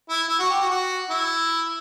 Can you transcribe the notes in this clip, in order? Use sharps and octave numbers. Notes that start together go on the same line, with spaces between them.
E4
E4
F#4
G4
F#4
F#4
E4